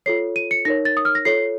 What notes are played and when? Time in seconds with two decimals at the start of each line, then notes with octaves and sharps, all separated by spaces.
0.06 F4 A4 C#5 C7
0.36 D#7
0.51 C#7
0.65 D#4 A#4 C#5 A#6
0.85 A6
0.97 D#6
1.05 F6
1.15 A#6
1.25 F4 A4 C#5 C7